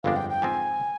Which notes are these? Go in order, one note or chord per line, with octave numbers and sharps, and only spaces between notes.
G1 F2 D3 G#3 D4 F5
G5
G5
G#2 F3 C4 G#5